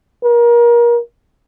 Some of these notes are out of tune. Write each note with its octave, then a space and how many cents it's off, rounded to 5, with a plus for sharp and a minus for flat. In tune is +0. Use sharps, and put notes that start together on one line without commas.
A#4 +30